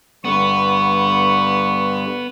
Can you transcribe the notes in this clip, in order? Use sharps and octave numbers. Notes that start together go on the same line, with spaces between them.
G2 D3 G3 B3 C#6